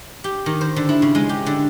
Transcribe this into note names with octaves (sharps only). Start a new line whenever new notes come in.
G4
D#3
C5
D3
E4
C#3
G#3
G4
D3